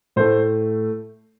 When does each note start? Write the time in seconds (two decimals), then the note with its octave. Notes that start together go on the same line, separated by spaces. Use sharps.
0.16 A2 A3 C5